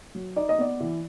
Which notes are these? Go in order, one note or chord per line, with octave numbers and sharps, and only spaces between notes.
F#3
D#4 D5
D#5
B3 D5
E3